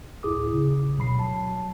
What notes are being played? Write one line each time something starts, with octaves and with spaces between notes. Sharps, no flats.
D2 A2 E4 G#4 D6 D#6
A#1 C#3
D2 B2 F#3 B5 C7
F#3 A5